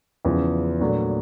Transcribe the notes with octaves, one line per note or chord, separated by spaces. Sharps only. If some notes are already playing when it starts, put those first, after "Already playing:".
E2 C#3 F3
A#2 F#3 A3 D4